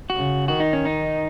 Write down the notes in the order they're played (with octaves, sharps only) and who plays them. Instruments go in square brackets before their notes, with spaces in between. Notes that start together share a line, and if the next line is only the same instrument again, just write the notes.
[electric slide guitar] F#4
[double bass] C#3
[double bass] D#3 [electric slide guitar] F#4
[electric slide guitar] D#4
C#4
D#4